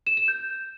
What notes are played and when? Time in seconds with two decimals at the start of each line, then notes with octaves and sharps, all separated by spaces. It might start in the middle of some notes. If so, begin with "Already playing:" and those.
0.07 E7
0.17 E7
0.28 G6